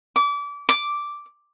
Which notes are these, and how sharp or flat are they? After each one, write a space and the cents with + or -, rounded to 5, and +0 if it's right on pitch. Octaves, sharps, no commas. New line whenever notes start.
D6 -30
D6 -5